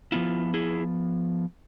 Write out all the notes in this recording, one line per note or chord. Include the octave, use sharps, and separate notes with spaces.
F3 B3 E4 F4
E4 G#4